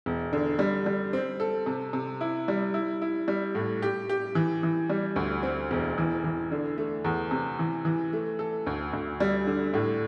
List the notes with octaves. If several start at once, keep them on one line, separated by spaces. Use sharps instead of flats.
E1
D3
G3
G3
C4
A4
C3
C3
E4
G3
E4
E4
G3
A2
G4
G4
E3
E3
G3
D2
C4
E1
E3
E3
D3
A3
E2
C3
E3
E3
A3
A4
D2
D2
G3
D3
A2